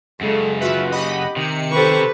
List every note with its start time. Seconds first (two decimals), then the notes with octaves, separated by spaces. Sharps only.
0.21 F#2 C#3 G#3 A4
0.61 F4 F#4 B4 E5
0.92 G4 D#5 F#5 B5
1.36 C3 D#3 C#7
1.72 G4 A4 B4 C5 C#6